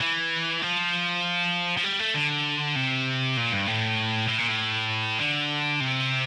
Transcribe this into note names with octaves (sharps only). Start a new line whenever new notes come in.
E3
F3
F3
G3
A3
D3
C3
A#2
G2
A2
A2
A#2
A2
D3
C3